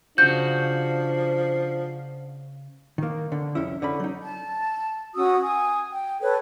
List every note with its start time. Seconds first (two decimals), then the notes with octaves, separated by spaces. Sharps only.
0.18 C#3 F3 D4 F#4 G6
2.98 D#3 A#3
3.32 D3
3.55 C2 F2 C#4 E4
3.82 D3 C#4 B5
4.00 F#3 D#4
4.24 A5
5.15 C#4 F#4 D#6 E6
5.41 G#5 D#6
5.93 G5
6.21 A4 B4 C#5